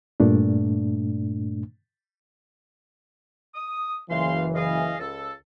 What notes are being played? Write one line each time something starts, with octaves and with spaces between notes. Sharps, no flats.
G2 A#2 A3 D4
D#6
F#1 C#2 E3 F5 C6
G#4 D#5 F5
C#2 A4